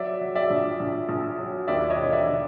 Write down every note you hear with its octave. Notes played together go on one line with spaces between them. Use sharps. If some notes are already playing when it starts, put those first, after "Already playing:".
Already playing: F#3 D5 E5
F#3
D5 E5
A#1
A#1
A#1
F#3
D#2 D5 E5
C#5 D#5
E1
D5 E5
D3